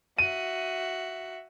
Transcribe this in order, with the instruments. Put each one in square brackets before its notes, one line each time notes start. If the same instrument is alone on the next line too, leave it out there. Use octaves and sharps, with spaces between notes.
[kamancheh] F#4 E5 [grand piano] D#7